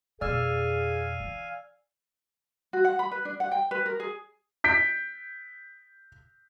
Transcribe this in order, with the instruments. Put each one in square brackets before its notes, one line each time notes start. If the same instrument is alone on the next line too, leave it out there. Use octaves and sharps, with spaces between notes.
[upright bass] F2 B2 [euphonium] G#4 [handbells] D5 E6 F6 [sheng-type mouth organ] F5 G#5
[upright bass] E3
[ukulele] F#4
F#5
B5
B4
D4
F#5
G5
B4
A#4
G#4
[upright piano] G6 B6 D7